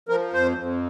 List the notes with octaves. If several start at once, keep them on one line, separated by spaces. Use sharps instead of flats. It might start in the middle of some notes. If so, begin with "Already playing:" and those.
F3 A#4
F2 C5
F2